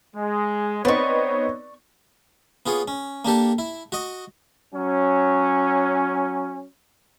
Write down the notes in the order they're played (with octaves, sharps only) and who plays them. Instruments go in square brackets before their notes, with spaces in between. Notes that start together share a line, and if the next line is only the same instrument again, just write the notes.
[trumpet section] G#3
[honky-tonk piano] B3 C4 D#4 [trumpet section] C#5 [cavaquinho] D5 C#6
[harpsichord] B3 F4 G#4 C#5
C#4
A#3 D4 G4 A4
E4
F#4 D#5
[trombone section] F#3 C#4